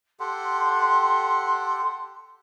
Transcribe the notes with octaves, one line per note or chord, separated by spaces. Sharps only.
G4 A4 F#5 C6